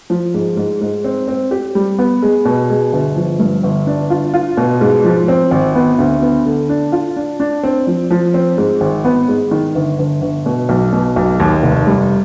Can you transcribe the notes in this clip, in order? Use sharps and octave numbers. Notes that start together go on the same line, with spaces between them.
F3
G#2
G#2
G#2
C4
C4
G4
G3
B3
G#3
B2
G#3
G1
F3
G2
G1
D4
F4
F4
B2
G#2
F3
C4
G#1
B3
D2
B3
D3
D4
F4
D4
D4
C4
F3
F3
C4
G#2
G#1
B3
G#2
D#3
G1
G1
G1
B2
B1
B2
B1
D#2
F1
G3